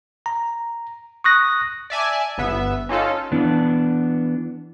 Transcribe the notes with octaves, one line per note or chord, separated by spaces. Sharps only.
A#5
C#6 D#6 F#6 A#6
D5 E5 G#5 A5
G1 B3 E5
C#4 D#4 F4 A4
E3 B3 D4